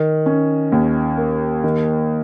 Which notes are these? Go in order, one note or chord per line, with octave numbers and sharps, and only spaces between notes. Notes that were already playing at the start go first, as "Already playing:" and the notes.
Already playing: D#3
C#4
D#2
A#3
D#3